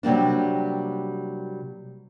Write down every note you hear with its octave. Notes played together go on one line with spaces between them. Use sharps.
C3 F#3 G3 A#3 D4